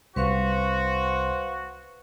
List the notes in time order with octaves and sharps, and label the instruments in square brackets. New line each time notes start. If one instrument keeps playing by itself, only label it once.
[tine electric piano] C2 [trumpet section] F#4 [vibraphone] B4 F5 C#6 [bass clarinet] C5